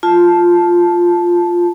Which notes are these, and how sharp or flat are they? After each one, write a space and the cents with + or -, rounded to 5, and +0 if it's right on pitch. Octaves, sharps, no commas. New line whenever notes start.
F4 +0 A5 -10